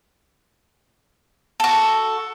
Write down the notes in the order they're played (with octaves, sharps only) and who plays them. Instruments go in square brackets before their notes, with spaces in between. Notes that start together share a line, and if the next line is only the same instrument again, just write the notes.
[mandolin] F#4 A4